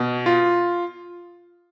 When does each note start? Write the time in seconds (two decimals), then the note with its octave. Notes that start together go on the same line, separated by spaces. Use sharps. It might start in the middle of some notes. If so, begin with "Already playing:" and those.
Already playing: B2
0.26 F4